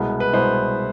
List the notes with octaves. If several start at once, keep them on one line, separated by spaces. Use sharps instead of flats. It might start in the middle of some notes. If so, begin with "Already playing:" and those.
Already playing: C2 B2 G#3 B3
B4
C2 B2 G#3 B3 C5